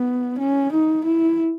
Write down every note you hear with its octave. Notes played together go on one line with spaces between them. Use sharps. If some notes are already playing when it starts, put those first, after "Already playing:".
Already playing: B3
C#4
D#4
E4